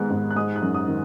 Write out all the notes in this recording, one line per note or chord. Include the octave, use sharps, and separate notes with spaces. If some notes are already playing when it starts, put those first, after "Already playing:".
Already playing: G#2 D#3 G#3 B3 F#6
G#2
F#6
G#3 D#6
F#6
F#2
D#6
D#3